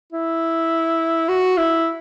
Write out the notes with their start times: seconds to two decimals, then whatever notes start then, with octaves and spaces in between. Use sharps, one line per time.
0.13 E4
1.29 F#4
1.58 E4